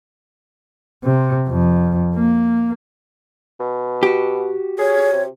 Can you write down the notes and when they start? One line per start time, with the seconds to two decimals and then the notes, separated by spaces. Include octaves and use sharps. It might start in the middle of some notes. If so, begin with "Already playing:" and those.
1.04 C3
1.49 F2
2.15 A#3
3.60 B2
4.03 F#4 G4
4.79 G#4 C#5
5.12 C3